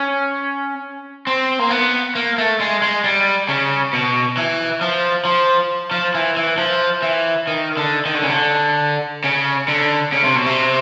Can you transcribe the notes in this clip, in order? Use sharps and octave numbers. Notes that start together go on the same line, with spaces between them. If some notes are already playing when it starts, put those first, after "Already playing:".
Already playing: C#4
C4
A#3
B3
A#3
A3
G#3
G#3
G3
C#3
B2
E3
F3
F3
F3
E3
E3
F3
E3
D#3
D3
D#3
D3
C#3
D3
C#3
D3
C#3
C3
B2
C3